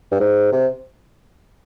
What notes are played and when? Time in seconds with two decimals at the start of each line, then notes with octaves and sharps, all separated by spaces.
0.12 G2
0.20 G#2
0.52 C3